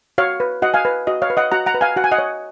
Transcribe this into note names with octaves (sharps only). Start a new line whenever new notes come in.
F#4 C#5 F5
B4
F#4 D#5 F#5
F5 G#5
B4
F#4 D#5
C#5 F5
B4
D#5 F#5
F#4 F#5 A#5
F#5 A#5
B4
F5 G#5
F#4 F#5
G#5
D#5 F#5
C#5